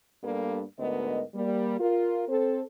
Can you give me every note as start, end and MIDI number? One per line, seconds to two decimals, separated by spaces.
0.24 0.63 43
0.24 0.63 55
0.24 0.63 58
0.24 0.63 59
0.24 0.63 62
0.24 0.63 69
0.79 1.22 38
0.79 1.22 44
0.79 1.22 59
0.79 1.22 70
0.79 1.22 75
1.34 1.79 55
1.34 1.79 58
1.80 2.25 65
1.80 2.25 70
2.29 2.62 60
2.29 2.62 69
2.29 2.62 72